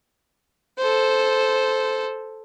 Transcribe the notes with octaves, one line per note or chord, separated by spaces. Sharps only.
A4 C5